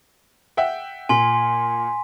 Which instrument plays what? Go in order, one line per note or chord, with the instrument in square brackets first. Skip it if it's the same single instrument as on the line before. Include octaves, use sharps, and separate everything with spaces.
[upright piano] E5 F#5 G5
[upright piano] A#2 [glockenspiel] G#5 C6 B6